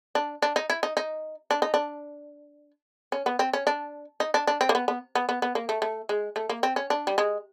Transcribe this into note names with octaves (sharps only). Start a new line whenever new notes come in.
D4
D4
D#4
E4
D#4
D#4
D4
D#4
D4
C#4
B3
C4
C#4
D4
D#4
D4
D4
C4
A#3
B3
B3
B3
B3
B3
A#3
A3
A3
G#3
A3
A#3
C4
C#4
D4
G3
G#3